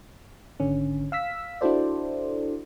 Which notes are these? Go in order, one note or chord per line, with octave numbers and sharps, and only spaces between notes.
G#1 D3 C#4
F5 E6 B6
D4 E4 F#4 A4 C5 D5